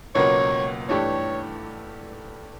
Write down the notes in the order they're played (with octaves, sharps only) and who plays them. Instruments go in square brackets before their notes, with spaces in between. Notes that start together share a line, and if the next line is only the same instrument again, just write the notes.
[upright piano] C#2 B2 F#3 A#3 [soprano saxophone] C#5
[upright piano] G2 E3 A3 D4 G4 [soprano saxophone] C#5